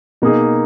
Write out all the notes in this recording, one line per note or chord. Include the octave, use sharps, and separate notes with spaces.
B2 A#3 D#4 G#4